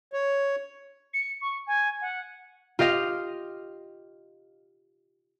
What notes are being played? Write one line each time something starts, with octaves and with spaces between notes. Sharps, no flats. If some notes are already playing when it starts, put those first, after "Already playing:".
C#5
C#7
C#6
G#5
F#5
F4 G4 D#5 F5